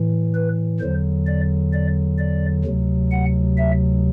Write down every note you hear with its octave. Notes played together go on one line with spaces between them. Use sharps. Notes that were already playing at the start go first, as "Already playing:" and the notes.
Already playing: A2 E3
B4
E2 D3 F#3 C5
D5
D5
D5
D2 C3 F#3
F#5
E5